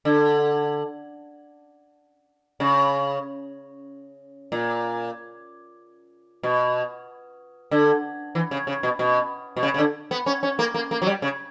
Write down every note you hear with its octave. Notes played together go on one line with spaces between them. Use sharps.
D3
C#3
A#2
B2
D3
E3
C#3
C#3
B2
B2
B2
C#3
C#3
D3
B3
C#4
C#4
A#3
A#3
A#3
F#3
G3
C#3